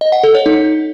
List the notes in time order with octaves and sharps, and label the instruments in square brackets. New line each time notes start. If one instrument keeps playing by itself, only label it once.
[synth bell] D#5
F#5
A4
C#5
D#4